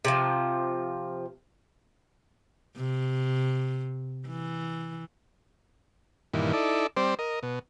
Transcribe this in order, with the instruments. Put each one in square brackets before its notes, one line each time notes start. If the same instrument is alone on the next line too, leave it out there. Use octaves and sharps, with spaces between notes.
[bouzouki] C3 F3
[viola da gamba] C3
E3
[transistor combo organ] G2 A#2 D#3 E3
D#4 E4 A4 D5
G3 C4 C5 D5
A#4 D#5
B2